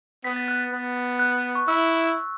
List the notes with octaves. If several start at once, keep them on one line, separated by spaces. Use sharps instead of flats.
B3 B6
A6
F#6
A6
B3
F#6
C#6
E4 E6